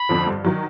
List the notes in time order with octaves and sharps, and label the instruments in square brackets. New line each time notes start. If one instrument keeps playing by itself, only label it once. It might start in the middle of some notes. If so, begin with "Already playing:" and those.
Already playing: [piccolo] B5
[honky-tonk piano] F2 D3 F3
G2
D#3 F#3